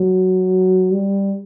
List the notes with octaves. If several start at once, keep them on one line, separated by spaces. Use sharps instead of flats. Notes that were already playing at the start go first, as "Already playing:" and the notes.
Already playing: F#3
G3